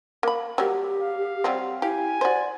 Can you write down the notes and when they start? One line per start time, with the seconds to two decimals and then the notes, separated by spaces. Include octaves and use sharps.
0.23 A#3 B5
0.58 F#3 G3 A#3 G4
1.01 F5
1.44 F#3 G3 C4
1.82 E4 G4 F5 G#5
2.21 F#4 C5 D5